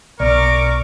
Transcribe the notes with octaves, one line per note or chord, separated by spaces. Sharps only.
B1 A#4 D5 C#6 D6